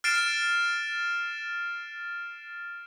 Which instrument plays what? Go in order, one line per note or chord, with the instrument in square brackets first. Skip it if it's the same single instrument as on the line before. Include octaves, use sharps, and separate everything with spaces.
[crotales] F6 A6 C7 D7 E7